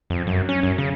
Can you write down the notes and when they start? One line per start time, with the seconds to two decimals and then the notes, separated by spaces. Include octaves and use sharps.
0.10 F2
0.27 F#2
0.49 C#4
0.63 F#2
0.78 C#3